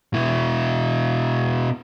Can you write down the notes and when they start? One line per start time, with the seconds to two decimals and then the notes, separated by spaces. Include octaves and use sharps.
0.14 B2 E4